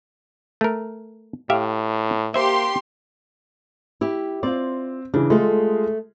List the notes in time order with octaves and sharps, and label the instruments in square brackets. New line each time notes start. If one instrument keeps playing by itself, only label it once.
[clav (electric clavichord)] A3 A#4
[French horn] A2 [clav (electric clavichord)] G4 E5 F5
[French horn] A#3 [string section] G4 C6 [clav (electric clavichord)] C5 E5
[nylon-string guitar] E4 G4
[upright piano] C4 [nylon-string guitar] F4 D5
[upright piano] C#3 E3 [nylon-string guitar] D4
[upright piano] G#3 F4 G#4 [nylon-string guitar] A3 A4